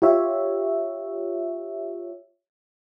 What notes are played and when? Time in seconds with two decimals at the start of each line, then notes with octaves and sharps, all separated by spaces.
0.02 F4 G4 C#5 E5